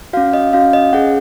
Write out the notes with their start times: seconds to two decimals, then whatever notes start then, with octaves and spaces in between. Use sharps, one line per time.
0.13 C#4 F#4 F5
0.33 D#5
0.53 C#4 F#4 F5
0.73 D#5
0.93 C#4 G#4 F#5